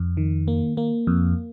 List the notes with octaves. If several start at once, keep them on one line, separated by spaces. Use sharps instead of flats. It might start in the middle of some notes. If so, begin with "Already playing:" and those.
Already playing: F2
D#3
A#3
A#3
F2